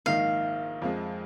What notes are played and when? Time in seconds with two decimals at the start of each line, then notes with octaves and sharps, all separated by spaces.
0.06 A#1 G#2 D#3 A#3 D#4 F5
0.82 F2 F3 G#3